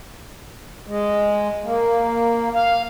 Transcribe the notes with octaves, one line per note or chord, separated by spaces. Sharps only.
G#3
A#3
F5